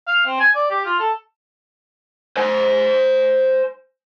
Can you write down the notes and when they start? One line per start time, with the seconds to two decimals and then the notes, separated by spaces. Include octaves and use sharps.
0.07 F5
0.26 C4
0.40 G#5
0.55 D5
0.70 G4
0.86 F4
1.00 A4
2.37 C5 G#5